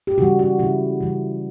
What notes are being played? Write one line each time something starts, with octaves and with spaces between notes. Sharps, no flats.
G4
C#3 E3 G3 F#4
F#4
C#3 E3 G3 E4
C#3 E3 G3